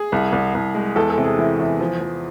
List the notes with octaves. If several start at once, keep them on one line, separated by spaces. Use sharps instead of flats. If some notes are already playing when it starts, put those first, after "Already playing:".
Already playing: G#4
C2
C2
C2
G#3
E2 A4
A4
C3
G#4
E3
E2
F3
F3